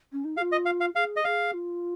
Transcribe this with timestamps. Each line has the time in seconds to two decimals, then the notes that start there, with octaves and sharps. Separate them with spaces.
0.13 C#4
0.25 D#4
0.37 G#4 F5
0.41 F4
0.52 D#5
0.66 F5
0.81 F5
0.95 G#4 F5
1.16 D#5
1.25 G#4 F5
1.54 F4